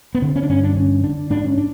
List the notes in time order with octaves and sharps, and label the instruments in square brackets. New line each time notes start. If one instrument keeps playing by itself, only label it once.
[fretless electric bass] B3
D3 C4
C#4
D4
G2 C#4
D4
D3 C#4
D3 D4
G#2 D4
C#4
D4